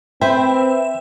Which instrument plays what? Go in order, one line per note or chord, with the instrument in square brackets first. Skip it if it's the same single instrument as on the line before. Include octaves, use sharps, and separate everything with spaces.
[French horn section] C4 [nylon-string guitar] B4 C5 [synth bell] E5 [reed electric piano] G5